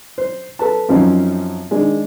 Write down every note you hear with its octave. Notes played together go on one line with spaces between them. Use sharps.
C5
A4 B4 A5
F#2 F3 C4 C#4 D#4
D#3 G#3 D4